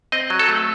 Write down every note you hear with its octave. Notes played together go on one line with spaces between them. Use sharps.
C4 D#5
F#3
A4
A3